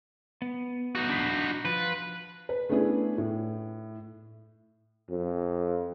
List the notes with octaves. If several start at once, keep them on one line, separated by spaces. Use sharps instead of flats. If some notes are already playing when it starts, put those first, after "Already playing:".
B3
D#4 F#4
D4 B5
F3 F4 B4
B4
A3 B3 C#4 D4 E4 G#4
A2
F2